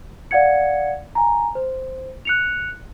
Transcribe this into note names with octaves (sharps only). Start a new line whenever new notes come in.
D5 F5 F#5 G#6 C#7
G#5 A#5
C5
F#6 C#7 F7